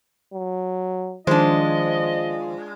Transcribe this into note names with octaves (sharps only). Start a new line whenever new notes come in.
F#3
D#3 F3 G#3 D4 F4 C5 D#5